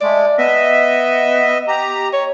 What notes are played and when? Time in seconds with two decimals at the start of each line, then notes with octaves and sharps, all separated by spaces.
0.01 G#3 A3 D5
0.38 B3 D#5 E5
1.68 G4 A#5
2.13 C#5